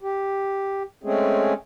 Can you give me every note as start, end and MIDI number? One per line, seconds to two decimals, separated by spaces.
0.01 0.83 67
1.04 1.54 56
1.04 1.54 57
1.04 1.54 60
1.04 1.54 61
1.04 1.54 68